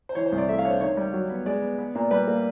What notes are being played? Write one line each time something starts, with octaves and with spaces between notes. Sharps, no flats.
C5
E3 C#5
C5
C2
D5
A3 E5
F5
D4 C#5
C5
D#3 C#5
G3
F#3
B3
G#3 D5
B3
B3
A#2
G3 B4
A#3